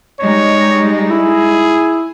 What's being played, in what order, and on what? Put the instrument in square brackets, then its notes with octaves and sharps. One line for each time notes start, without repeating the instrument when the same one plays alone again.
[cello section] G3 G#3 D#4 [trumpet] C#5
[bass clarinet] E4 [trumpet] G#4